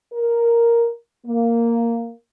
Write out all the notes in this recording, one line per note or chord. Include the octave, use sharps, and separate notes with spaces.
A#4
A#3